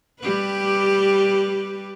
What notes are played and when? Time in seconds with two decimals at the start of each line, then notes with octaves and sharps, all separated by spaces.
0.21 G3 G4 B4